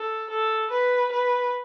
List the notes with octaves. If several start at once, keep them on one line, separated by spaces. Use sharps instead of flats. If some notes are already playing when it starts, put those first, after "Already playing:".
Already playing: A4
A4
B4
B4